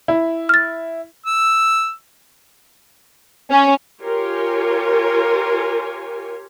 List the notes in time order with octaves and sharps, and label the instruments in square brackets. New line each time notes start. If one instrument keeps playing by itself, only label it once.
[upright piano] E4
[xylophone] F6 A6
[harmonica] E6
[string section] C#4
[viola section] F4 G4 A#4 C#5 G#5